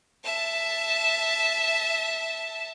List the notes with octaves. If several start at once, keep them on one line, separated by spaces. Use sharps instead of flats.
E5 A5